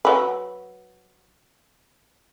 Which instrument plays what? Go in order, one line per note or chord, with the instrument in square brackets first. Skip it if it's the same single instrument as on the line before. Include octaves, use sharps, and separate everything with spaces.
[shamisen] F#3 B4